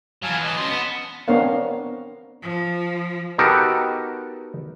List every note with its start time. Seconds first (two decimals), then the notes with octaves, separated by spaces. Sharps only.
0.23 E3 F#3 F5 G#5 A5
0.43 D#5 A5
0.59 C#4 C6
0.71 B3
1.28 B3 C4 D4 A#4 C#5 F5
2.42 F3
3.38 B3 D#4 F#4 G4 A4 A#4